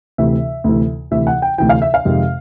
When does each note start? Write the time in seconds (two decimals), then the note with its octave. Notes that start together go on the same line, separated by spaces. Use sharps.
0.18 D2 C3 E3 E5
0.64 D2 C3 E3
1.11 D2 C3 E3 E5
1.27 F#5
1.42 G5
1.58 D2 C3 E3 G5
1.69 F5
1.82 E5
1.94 F5
2.05 F2 C3 D#3 G#3